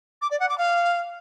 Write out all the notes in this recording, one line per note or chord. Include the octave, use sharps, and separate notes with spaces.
D6
D5
F#5
D6
F5